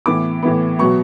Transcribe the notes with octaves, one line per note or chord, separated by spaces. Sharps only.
A2 E3 B3 D6
A2 E3 B3
B2 F#3 B3 C#6